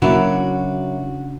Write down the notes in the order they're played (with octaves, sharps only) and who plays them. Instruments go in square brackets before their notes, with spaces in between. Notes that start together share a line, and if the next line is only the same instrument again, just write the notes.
[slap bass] C#3 D4 [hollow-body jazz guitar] F#3 A#3 E4 [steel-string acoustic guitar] F#4